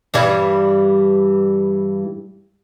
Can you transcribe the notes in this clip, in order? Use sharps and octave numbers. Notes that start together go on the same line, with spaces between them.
G2 E3 G3